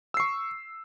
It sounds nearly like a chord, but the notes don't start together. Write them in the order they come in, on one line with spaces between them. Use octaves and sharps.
E6 C7 C#6